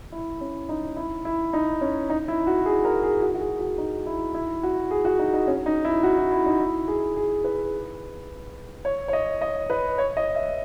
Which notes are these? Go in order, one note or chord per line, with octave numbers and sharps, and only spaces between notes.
E4
C#4
D#4
E4
E4
D#4
C#4
D#4
E4
F#4
G#4
A#4
G#4
F#4
F#4
G#4
F#4
D#4
E4
E4
F#4
G#4
F#4
D#4
D#4
C#4
D#4
E4
F#4
E4
E4
D#4
E4
G#4
G#4
B4
C#5
C#5
D#5
D#5
B4
C#5
D#5
E5